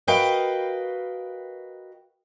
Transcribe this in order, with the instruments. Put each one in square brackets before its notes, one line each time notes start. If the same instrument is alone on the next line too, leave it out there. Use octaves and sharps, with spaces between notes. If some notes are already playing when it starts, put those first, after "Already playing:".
[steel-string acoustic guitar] F#4 A#4 B4 D#5 F5 G5